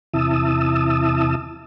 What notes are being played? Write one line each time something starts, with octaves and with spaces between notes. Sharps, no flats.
E2 C3 E4 A5 D#6 E6